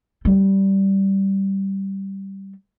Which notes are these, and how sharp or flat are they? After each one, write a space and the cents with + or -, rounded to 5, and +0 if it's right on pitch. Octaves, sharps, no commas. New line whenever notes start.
G3 -10